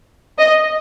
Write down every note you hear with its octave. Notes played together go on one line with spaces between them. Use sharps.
D#5